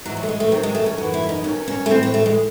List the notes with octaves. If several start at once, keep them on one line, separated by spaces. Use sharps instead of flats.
G#2 E3 F#3
F#3
A3
G#3
A3
E2 D#3 F#3 C4
G#3
A3
C#4
F#2 E3 F#4
E4
C#4
D#4
E2 D#3 F#3 C#4
C#4
A3
A2 E3 C4
C4
A3
G#3